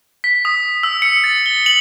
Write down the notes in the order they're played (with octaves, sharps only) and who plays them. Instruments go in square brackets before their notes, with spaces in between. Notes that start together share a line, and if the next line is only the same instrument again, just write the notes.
[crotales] B6
D#6
E6
C#7
A6
G7
F#7